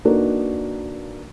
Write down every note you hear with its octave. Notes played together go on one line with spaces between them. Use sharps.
A#3 D4 D#4 F#4 A#4 B4